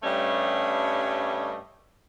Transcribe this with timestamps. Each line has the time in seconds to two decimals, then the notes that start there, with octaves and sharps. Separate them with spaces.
0.03 G2 G3 A3 C#4 D#5